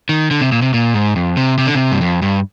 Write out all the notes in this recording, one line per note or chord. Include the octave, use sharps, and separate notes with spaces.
D#3
D3
C3
A#2
C3
A#2
G#2
F2
C3
C3
D3
C3
G2
F2
G2